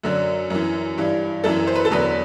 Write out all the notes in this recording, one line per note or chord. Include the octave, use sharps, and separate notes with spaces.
F#2 D3 F#3
F#2 E3
G2 E3
F#2 E3 A4
C5
B4
A4
E2 D3 F#3 B4